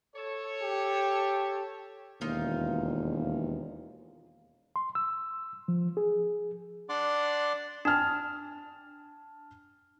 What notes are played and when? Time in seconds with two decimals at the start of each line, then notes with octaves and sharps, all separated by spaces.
0.16 A4 C#5
0.63 G4
2.21 E1 D#2 D#4 F4 F5
4.76 C6
4.95 E6
5.68 F3
5.97 G#4
6.89 D4 D5 F#5 C6 D6
7.85 D4 G#5 A5 F6